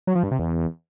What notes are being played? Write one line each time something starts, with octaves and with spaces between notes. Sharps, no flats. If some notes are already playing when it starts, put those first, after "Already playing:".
F#3
F3
G2
C3
E2